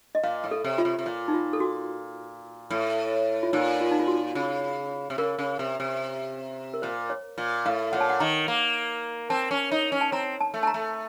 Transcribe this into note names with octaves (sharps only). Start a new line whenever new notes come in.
D#5
A#2 F5
A2
A4
C3
F4
C3
C3
A#2
D#4
F4
A4
F#4
A2
F4
A#2 D#4
F4
D#4
F4
F#4
C#3
C3
C#3 A#4
C#3
C3
C3
A#4
A#2 C5
C#5
A#2
A2 F5
A#2 F#5
A5
F#5
D#3 A#5
A#3
C4 A5
C#4
D#4
C#4
A5
C4 A#5
A5
A3
A5
A#5
A3